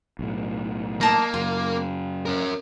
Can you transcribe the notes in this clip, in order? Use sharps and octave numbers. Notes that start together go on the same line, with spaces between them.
B1 A2
A#3 D#5 A5 A#5
F#2 C#3 F4
C#4 A#4